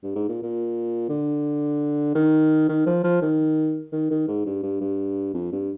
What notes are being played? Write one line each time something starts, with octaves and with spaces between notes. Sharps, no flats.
G2
G#2
A#2
A#2
D3
D#3
D#3
F3
F3
D#3
D#3
D#3
G#2
G2
G2
G2
F2
G2